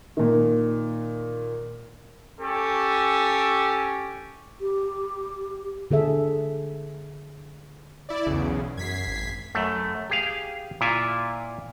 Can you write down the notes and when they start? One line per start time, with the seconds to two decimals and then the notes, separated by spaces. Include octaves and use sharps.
0.17 A#2 D#3
2.40 C#4 G4 A4
4.61 G4
5.91 D3 G#4 A4 E5
8.09 E4 D5
8.27 B1 E2 C#3
8.77 F#2 G#6 B6 C7
9.07 G#1
9.55 F#2 A3
10.10 G4 G#4 F5
10.81 A#2 E4 F4 G#5